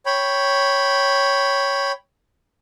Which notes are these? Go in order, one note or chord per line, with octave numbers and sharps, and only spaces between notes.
C#5 G5 B5